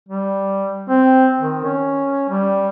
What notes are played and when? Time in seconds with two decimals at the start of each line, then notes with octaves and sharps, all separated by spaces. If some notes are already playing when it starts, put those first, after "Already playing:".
0.09 G3
0.89 C4
1.40 D#3
1.64 C#4
2.29 G3